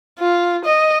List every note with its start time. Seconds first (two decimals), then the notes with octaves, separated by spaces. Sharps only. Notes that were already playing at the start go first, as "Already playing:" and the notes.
0.19 F4
0.65 D#5